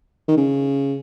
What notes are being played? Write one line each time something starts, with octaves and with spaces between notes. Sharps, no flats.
D#3
C#3